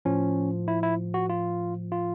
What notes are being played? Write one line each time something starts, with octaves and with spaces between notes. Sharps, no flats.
A2 F3 C#4
E4
E4
F#4
F4
F4